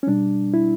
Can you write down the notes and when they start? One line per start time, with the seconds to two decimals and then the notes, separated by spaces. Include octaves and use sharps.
0.03 C#4
0.07 B2 G3 D4
0.54 E4